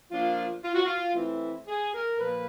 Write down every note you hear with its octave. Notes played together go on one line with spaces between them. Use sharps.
F3 A#3 D4 F4
F4
F#4
F4
E3 A3 C4 E4
G#4
A#4
A#2 F3 A#3 B4